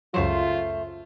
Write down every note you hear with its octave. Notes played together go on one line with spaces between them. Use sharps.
C#2 F#2 F#3 A3 F4 C5